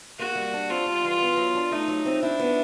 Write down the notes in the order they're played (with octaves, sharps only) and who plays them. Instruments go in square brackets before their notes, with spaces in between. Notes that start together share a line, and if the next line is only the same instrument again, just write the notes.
[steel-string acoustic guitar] A#3 [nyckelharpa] F#4
[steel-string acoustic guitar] G3
D4
[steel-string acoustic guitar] C4 [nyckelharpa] F4
[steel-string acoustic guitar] G3
E3
B3
F#3
D4
[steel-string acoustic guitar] A3 [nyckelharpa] D#4
[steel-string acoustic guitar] F#3
C4
[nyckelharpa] D4 [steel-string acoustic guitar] E4
[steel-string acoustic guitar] B3